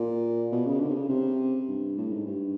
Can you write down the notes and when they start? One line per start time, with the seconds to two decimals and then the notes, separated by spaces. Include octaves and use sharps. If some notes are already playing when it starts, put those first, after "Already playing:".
Already playing: A#2
0.52 B2
0.66 C#3
0.80 D3
0.90 C3
0.95 C#3
1.09 C3
1.68 G2
1.98 A2
2.12 G#2
2.26 G2